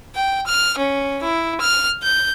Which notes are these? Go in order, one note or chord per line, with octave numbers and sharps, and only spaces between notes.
G5
F6
C#4
E4
F6
G6